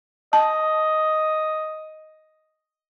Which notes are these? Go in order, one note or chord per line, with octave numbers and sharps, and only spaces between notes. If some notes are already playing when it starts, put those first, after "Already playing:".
D#5 A5